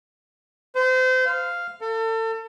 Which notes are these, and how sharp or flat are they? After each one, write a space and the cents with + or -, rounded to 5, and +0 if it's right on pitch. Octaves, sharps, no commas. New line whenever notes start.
C5 -30
F5 -5
A4 +35